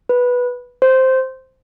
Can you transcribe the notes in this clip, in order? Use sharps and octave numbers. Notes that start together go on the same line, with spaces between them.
B4
C5